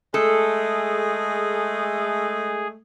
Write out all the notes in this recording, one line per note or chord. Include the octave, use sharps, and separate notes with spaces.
G#3 A3 G#4 A4